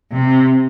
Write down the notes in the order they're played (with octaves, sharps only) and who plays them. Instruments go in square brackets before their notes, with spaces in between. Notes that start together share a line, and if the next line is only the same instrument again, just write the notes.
[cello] C3